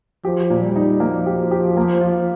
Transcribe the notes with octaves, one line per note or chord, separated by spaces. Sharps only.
F3 G4
A#2
G3
D#4
F3 A#3
G4
G4
A#3
F4